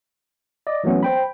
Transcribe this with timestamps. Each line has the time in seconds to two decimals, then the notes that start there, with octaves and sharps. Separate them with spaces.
0.67 D5 D#5
0.84 E3 F#3 A3 B3 C#4
1.03 C5 G5 B5